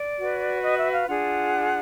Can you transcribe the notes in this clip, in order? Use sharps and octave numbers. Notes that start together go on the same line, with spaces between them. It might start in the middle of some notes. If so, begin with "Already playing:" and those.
Already playing: D5
F#4 B4
D#5
E5
F5
D4 F4 G#4 F#5